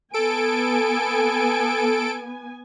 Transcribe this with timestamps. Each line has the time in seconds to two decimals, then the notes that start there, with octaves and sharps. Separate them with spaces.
0.14 B3 A4 G#5 D7